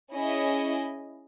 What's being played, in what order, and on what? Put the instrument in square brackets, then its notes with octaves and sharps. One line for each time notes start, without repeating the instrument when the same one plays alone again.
[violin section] C#4 E4 G#4 D#5